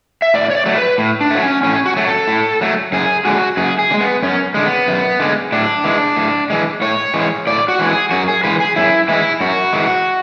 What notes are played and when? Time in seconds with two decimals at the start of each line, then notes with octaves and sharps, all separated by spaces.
0.22 E5
0.34 A2 D5
0.50 C#5
0.55 D5
0.66 F#3 A3
0.78 B4
0.98 A2
1.21 D4
1.30 F#3 A3
1.42 C#4
1.63 A2 C#4
1.86 F#4
1.96 F#3 A3
2.07 A4
2.28 A2
2.61 F#3 A3
2.92 F#2 G#4
3.25 D3 G#3 F#4
3.57 F#2 G#4
3.79 G#4
3.91 D3
3.94 G#3
4.00 B3
4.22 F#2 C#4
4.54 D3 G#3
4.66 B3
4.88 F#2
5.20 D3 G#3
5.52 A2 D4
5.84 E3 G#3
6.16 A2
6.50 E3 G#3
6.81 A2 C#5
7.14 E3 G#3
7.47 A2 D5
7.68 F#4
7.79 E3 G#3
7.89 G#4
8.11 F#2 F#4
8.28 G#4
8.44 E3 G#3 B4
8.60 G#4
8.76 F#2 E4
9.08 E3 G#3 E4
9.41 F#2 F#4
9.73 E3 G#3